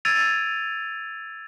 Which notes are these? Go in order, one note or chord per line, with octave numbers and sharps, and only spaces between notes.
E6 G#6 A6 D7 D#7 F7